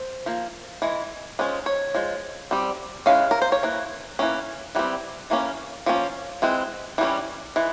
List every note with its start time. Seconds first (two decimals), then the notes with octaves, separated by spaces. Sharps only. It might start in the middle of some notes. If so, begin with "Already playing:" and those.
Already playing: C5
0.26 F3 A#3
0.82 E3 G#3
1.39 F3 G#3 C#4
1.66 C#5
1.95 F3 G#3
2.51 G3 C4
3.06 E3 G#3 C#4 F5
3.31 A#4
3.42 C5
3.52 C#5
3.63 E3 A#3
4.19 E3 A#3 C#4
4.75 E3 G3 C4
5.30 E3 A#3 C#4
5.86 F3 A#3 C#4
6.42 E3 G#3 C4
6.98 E3 G3 C#4
7.56 E3 G#3